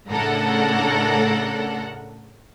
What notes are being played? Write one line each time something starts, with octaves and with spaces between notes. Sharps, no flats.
A2 C#3 D4 A4 A#4 F#5